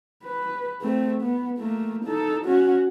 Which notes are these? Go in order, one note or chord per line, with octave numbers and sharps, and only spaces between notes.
B4
A3 C4
B3
A3 A#3
D#4 A4
C#4 F#4